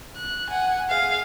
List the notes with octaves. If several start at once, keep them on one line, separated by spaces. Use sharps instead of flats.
F#6
F#5 G#5
G#4 F5